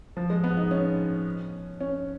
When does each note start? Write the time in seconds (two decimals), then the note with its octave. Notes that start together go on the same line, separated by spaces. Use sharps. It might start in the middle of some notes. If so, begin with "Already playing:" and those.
0.17 F3
0.30 G#3
0.44 B3
0.57 D#4
0.71 C#4
1.81 C#4